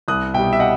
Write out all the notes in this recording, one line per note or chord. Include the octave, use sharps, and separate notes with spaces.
C2 D#6 F#6
B2 G3 E5 G5
E5
D#5 F#5